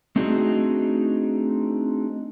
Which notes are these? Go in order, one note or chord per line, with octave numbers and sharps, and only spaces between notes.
A3 C4 D4 D#4 F#4 G#4